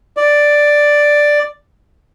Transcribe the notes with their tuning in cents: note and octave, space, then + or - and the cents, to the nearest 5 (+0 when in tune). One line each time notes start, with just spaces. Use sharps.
D5 +5